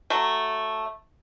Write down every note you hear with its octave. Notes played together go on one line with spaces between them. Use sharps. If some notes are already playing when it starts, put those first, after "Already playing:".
F#3 A3